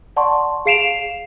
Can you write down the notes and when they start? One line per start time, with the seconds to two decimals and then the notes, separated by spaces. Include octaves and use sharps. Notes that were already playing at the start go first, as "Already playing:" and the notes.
0.16 D5 F#5 A5 C6 C#6
0.66 G#4 F5 C7 D7 E7 F7